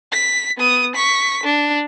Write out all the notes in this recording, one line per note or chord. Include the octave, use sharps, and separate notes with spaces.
B6
B3 D#6
C#6 B6
D4